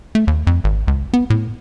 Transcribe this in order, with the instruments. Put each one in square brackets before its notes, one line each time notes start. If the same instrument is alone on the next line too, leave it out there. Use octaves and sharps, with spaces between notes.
[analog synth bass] A3
D#2
F2
G#1
C#2
B3
A2